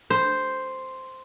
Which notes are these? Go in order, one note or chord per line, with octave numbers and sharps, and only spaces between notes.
C5